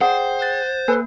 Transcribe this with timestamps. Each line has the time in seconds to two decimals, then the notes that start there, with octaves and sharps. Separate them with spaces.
0.01 G#4 C5 D5 F#5 G5
0.41 F#6 A6
0.88 A#3 A4 B4 G#5